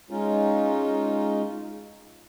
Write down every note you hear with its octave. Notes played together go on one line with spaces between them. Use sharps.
G#3 C#4 D#4 F4